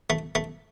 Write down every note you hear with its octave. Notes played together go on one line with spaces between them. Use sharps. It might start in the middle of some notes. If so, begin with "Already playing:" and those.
A3
A3